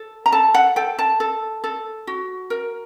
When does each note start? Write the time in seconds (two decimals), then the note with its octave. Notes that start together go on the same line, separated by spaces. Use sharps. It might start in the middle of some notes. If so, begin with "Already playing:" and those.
Already playing: A4
0.26 A#5
0.32 A4 A5
0.54 F#5
0.76 A4 G5
0.99 A5
1.20 A4
1.64 A4
2.07 F#4
2.50 A#4